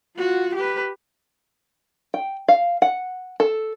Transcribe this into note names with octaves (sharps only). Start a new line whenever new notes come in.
F4 F#4
G4 B4
G5
F5
F#5
A4